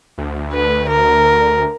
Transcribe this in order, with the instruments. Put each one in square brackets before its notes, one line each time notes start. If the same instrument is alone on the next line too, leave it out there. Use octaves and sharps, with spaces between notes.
[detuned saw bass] D2
[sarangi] B4
A#4